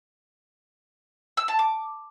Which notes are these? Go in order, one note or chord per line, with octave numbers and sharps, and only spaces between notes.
E6
A5
D6